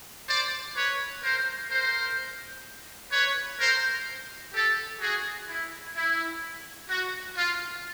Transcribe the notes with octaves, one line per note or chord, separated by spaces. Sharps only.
C5 D5
B4 C#5
A#4 C5
A#4 C5
B4 C#5
A#4 C5
G4 A4
F#4 G#4
E4
E4
F#4
F4